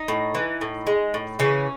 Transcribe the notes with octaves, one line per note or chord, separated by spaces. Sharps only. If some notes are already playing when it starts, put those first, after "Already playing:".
Already playing: D#4
A2
E3
A2
G#3
A2
C#3 E3 C#4